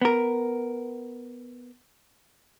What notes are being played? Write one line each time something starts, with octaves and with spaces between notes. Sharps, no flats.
B3 A#4